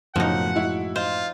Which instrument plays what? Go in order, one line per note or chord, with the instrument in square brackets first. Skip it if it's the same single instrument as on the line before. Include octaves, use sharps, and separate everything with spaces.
[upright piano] F#1 B1 [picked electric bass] F#2 A2 F#3 [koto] F3 D#4 [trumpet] F#5
[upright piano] G#3 E4 F#4
[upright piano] D#4 [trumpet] F4 [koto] C5